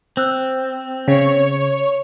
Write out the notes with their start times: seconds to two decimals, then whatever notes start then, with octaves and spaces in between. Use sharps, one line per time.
0.17 C4 C5 E6 F#6
1.08 C#3 C#5